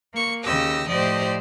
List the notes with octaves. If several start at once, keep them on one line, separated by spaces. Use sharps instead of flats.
A#3 C#6
D#2 C#3 G4 D#5 E6 A#6
A2 F3 G4 C5 D5 D#5